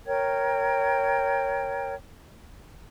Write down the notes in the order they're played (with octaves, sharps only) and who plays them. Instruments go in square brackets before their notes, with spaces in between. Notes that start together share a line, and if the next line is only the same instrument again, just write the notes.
[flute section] A#4 C#5 G5 G#6